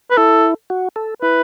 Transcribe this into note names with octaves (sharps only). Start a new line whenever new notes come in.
B4
E4 A4
F#4
A4
E4 B4